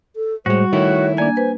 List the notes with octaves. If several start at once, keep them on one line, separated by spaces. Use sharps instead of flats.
A4
A2 G3 G#3 F#4 C5
D#3 A3 E4 C#5
A#3 D4 D5 G#5
B4 C5